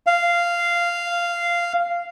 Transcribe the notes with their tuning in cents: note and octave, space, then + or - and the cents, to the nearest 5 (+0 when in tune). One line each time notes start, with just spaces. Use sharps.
F5 -10